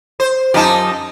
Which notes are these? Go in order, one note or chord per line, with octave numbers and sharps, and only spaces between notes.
C5
F#2 D#4 F4 G4 A5